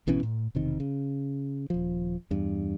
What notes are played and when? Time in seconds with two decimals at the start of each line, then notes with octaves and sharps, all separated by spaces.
0.07 G#1 B2 E3 C#4
0.23 A2
0.55 E1 C3 D#3
0.80 C#3
1.70 D#1 F3
2.31 E2 G2